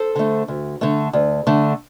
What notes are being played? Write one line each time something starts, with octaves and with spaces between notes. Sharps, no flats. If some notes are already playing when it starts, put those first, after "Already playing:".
Already playing: A4 C5
D3 A3
D2
D3 A3
D2
D3 A3